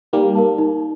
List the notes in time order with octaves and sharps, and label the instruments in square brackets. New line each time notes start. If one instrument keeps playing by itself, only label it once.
[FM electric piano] G3 A#3 [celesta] D#4
[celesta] A#4 F5 A5
D#4